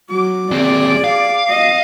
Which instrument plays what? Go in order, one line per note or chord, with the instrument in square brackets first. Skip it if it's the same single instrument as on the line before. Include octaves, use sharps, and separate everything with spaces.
[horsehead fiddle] F#3 [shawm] D6
[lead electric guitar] D#2 C4 [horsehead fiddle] G#4 D5
[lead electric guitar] F5
[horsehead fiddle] D#5